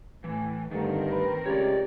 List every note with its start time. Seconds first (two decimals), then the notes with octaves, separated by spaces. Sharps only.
0.24 A2 E3
0.71 G2 D3 D#3 A3 C4 A#4
1.12 B4
1.46 C#2 G4 C#5 D5